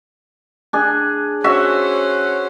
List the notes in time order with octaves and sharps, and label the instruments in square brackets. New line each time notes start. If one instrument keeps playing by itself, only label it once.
[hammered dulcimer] D4 G#4
[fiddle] C#4 C5 [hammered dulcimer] F#4 E5